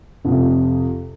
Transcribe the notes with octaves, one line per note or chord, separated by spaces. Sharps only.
F2 C3